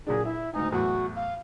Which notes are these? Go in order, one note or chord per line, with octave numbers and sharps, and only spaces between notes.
A#2 F#3 D4 G#4
E4 E5
D2 G#2 D#4 G#5
E2 A2 F#3 F#4
F5